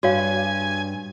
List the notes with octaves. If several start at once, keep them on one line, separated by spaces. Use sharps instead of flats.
G2 F#4 C#5 F5 G#5